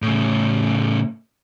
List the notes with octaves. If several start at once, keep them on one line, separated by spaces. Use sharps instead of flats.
A2 C#3